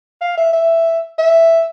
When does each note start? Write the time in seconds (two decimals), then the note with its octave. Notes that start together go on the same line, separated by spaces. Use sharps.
0.21 F5
0.37 E5
0.53 E5
1.18 E5